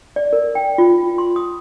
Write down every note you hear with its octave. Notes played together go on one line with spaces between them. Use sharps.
D5
A#4
G5
F4
C6
D#6